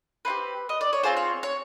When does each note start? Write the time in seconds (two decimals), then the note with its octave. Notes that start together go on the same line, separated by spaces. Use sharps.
0.25 C4 E4 G4 B4
0.69 D#5
0.81 D5
0.93 C#5
1.03 C4 F4 G#4 C5
1.17 C#5
1.43 C#5